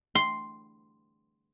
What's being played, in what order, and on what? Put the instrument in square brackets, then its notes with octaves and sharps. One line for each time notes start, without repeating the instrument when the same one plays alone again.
[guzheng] C6